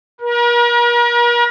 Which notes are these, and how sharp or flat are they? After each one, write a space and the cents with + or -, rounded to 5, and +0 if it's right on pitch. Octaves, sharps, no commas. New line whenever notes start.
A#4 +40